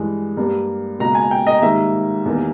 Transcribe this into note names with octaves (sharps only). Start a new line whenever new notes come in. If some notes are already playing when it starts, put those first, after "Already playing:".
Already playing: G2 E3 G#3
G2 G3 A#3
C#2 B2 A#3 A#5
G#5
G5
D#5
G#2 D#3 G3 A#3 E5
E2 D#3 G3 A#3